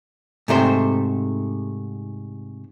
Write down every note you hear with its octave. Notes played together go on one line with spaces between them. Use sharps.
G#2 C3 A3 C5 G5